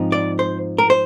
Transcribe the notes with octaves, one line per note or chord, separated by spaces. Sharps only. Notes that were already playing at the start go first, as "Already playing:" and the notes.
Already playing: G#2 F3 C4 D#4
D5
C5
A#4
C5